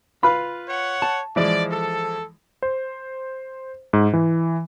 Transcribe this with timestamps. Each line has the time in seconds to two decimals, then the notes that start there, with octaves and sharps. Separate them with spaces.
0.23 F4 B4 F5 B5
0.68 C#5 F#5
1.02 A5
1.36 E3 F3 G#3 D5
1.70 A4
2.62 C5
3.93 G#2
4.13 E3